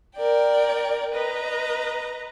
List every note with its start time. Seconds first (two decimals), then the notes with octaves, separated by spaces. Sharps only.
0.16 A#4 D5 G5
1.15 B4 D#5 A#5